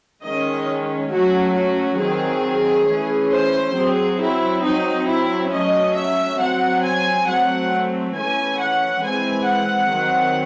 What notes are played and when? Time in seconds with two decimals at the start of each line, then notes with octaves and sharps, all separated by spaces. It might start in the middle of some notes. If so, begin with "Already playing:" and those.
0.23 D#3 G#3 C#4 D#5
1.11 F#3 A3 C#4 F#4
1.55 F#4
1.99 D#3 F#3 C4 G#4
2.87 E3 A3 C#4
3.31 C5
3.75 F#3 C4 G#4
4.20 E4
4.63 F#3 C4 D#4
5.07 E4
5.52 F#3 A3 C#4 D#5
5.95 E5
6.39 F#3 C4 F#5
6.83 G#5
7.26 F#3 A3 C4 F#5
8.14 E3 A3 C#4 G#5
8.58 F#5
9.02 E3 G#3 C4 G#5
9.47 F#5
9.91 D#3 F#3 C4